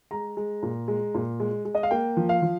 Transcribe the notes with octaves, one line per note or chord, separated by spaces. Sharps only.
G#3 A#5
G#3
A#2
G#3
A#2
G#3
G#3
D#5
F5
A#3 G5
F3
F5
F3